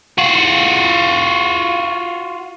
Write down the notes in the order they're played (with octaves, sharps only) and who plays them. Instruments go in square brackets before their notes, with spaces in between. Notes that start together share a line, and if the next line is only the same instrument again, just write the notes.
[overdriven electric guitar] F4 F#4